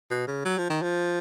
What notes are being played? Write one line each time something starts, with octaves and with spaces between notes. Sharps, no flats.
B2
C#3
F#3
F3
D#3
F3